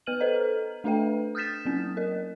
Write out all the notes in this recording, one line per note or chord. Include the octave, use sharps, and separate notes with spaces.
B3 B4 F6 D#7 F#7
A4 B4 C5 D#5 A#5
A3 D4 A4 B4 E5 G5
D#6 F6 G6 A6 B6 E7
F#3 A#3 C4 C#4
A#4 D#5